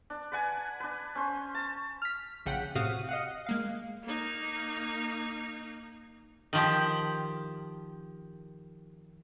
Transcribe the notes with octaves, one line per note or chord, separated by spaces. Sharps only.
D4
B4 D5 F#5 G#5
D4 B4
C#4 C5
A5
F6 B6
A#1 C#3 F#5 G5 B6
A2 C3 F#4 F5 D#6
D#5 F5 F#5
G#3 A#3 F5
A#3 D#4
D#3 F3 G4